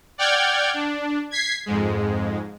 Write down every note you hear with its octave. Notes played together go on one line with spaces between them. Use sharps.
D5 F#5 G5 F6 G6 G#6
D4
G#6 B6 C7
F2 G#2 G#3